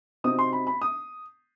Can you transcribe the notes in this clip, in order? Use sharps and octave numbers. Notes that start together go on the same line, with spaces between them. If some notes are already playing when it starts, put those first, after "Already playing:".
C3 F#3 C4 D#4 D#6
C6
B5
B5
D#6